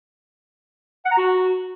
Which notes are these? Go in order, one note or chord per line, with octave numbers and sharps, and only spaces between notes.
F#5
A#5
F#4